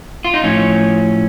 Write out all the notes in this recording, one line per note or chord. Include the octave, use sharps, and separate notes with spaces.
F4
D#4
A2 F3 C#4